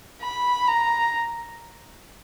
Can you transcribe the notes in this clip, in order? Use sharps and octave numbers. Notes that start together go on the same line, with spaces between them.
B5
A#5